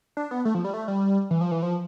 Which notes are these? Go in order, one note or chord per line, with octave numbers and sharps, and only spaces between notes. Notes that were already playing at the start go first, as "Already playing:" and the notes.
D4
B3
A3
F3
G3
A3
G3
E3
F3
E3
F3